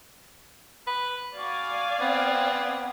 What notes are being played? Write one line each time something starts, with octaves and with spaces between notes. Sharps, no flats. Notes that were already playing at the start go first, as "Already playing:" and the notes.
B4
F#4 D5 F5 G#5
B3 C4